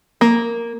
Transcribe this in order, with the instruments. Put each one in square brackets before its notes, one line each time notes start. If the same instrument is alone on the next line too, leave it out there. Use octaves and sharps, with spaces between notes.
[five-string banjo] A#3